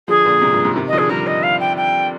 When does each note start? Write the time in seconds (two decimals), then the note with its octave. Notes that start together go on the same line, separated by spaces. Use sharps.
0.08 D3 F3 G#4
0.25 A#2 D3
0.42 G#2 C3
0.53 G2 A#2
0.64 G#2 C3
0.76 C3 D#3
0.88 D#5
0.93 D3 F3
0.98 G#4
1.09 D#3 G3 A#4
1.27 D#5
1.43 F5
1.60 G5
1.77 G5